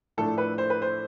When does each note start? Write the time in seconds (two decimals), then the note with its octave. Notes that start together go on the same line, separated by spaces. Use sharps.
0.17 A2 F3 A3 D4 A4
0.38 B4
0.58 C5
0.70 B4
0.82 C5